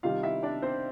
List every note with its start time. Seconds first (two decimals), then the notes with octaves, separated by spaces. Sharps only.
0.03 C3 D#3 G3 F4 F5
0.23 E4 E5
0.43 D4 D5
0.62 C4 C5